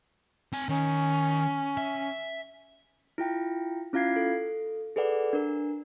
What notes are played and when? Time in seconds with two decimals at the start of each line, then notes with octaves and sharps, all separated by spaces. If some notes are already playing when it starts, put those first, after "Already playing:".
0.52 C4 G#5
0.69 D#3 C#4
1.77 E5
3.18 E4 F4 G5
3.93 C#4 E4 F4 F5 G#6 C7
4.16 A4
4.96 G#4 A4 B4 D5 F#5
5.33 D4 A#4